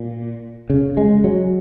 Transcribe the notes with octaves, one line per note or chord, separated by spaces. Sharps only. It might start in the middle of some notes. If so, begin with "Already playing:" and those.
Already playing: A#2
C#3
G#3
F#3